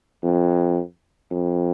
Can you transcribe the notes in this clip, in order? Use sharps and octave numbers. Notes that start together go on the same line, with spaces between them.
F2
F2